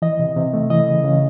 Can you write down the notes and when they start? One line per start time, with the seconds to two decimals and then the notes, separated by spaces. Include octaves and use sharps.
0.02 E3 D#5
0.19 C3
0.36 C3
0.53 A3
0.70 E3 D#5
0.87 C#3
1.04 C#3